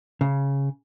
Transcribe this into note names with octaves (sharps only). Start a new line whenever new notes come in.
C#3